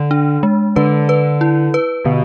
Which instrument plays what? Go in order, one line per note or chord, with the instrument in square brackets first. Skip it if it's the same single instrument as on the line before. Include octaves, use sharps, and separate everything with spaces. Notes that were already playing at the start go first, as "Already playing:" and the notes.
Already playing: [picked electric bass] D3
[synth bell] D4
G#3
[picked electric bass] D3 [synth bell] B4
[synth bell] B4
E4
B4
[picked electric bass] B2 [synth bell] D3